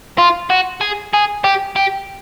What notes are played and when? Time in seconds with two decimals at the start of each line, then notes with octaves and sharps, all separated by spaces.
0.19 F4
0.50 F#4
0.81 G#4
1.13 G#4
1.44 G4
1.76 G4